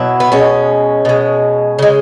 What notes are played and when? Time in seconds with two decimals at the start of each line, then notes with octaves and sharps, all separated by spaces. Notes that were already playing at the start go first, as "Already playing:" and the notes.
Already playing: B2 F#3 E4
0.20 B3
0.32 B2 G#3 C#4
1.05 B2 G#3
1.79 C#3 G#3